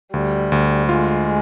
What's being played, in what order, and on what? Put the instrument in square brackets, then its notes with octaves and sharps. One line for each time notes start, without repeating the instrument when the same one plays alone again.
[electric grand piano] D2 [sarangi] G3
[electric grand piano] D2
[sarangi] G#3 [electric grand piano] F4